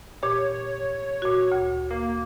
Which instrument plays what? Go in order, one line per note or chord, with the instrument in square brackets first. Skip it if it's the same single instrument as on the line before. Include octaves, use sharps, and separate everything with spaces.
[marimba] A#2 G4 [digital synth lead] C#5
[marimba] A#2 F#4
D2
[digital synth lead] A#3